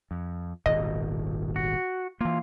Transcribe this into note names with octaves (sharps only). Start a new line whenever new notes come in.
F2
D#1 G#1 B2 D#5
F#4
E3 A#3 F4